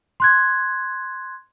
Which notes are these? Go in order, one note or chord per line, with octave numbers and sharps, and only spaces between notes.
C6 F#6 G#6